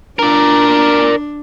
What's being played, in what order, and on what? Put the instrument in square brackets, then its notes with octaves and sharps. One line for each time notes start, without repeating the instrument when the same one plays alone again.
[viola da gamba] D4 [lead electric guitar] A#4 D5